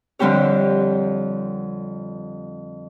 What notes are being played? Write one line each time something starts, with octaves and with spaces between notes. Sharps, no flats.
F2 D3 G3 C4 G4 C#5